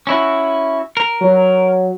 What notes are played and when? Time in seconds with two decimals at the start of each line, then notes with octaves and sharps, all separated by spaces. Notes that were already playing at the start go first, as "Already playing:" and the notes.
0.07 C#4 E4 F#4
0.97 A#4
1.21 F#3